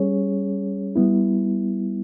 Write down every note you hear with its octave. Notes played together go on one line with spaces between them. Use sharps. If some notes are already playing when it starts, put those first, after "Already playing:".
Already playing: G3 C#4 G#4 C#5
G3 B3 E4